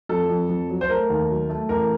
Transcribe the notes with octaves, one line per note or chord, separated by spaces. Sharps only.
F2 A4
F2
F2
F#3
C5
A3 A#4
D#2
F#3
A3
A1 A#4